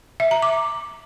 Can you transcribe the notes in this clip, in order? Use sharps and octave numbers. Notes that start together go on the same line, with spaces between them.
E5
A#5
D6